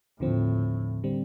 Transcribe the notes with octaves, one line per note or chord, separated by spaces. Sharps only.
D#2 A2 D3 F3 C4
D3 G3 C4